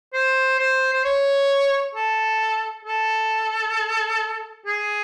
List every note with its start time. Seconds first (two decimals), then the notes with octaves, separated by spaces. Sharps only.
0.14 C5
0.59 C5
0.93 C5
1.04 C#5
1.95 A4
2.85 A4
4.66 G#4